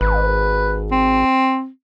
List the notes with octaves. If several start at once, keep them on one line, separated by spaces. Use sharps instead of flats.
G#1 B4
C4